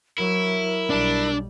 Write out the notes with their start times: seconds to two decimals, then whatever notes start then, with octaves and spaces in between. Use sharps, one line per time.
0.18 F#3 E4 A#4
0.90 B1 G3 D4